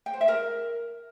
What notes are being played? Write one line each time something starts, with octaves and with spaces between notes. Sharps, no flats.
G5
C5
E5
A#4